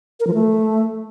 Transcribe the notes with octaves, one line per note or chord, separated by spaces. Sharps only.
A#4
F3
A3